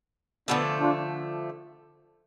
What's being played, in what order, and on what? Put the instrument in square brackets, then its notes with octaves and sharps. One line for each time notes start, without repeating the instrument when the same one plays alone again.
[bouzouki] D3 F3 A3 [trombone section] B3 D4
[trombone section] D4 F4